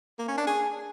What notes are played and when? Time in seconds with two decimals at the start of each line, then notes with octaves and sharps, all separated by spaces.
0.19 A#3
0.28 C#4
0.38 D4
0.47 G#4